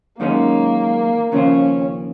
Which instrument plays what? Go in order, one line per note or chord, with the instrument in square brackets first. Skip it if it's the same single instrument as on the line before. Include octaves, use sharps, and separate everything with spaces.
[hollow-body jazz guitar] F#2 D#3 G#3 C#4 G#4 [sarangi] A#3
[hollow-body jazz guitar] D#2 C#3 F3 C4 F4 [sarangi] C#4